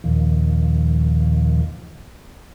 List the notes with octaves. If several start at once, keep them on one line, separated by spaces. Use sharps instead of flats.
D#2 A#2 D#3 F3